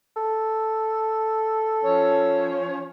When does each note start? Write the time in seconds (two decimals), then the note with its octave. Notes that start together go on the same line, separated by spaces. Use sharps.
0.16 A4
1.84 F3 C#4 C#5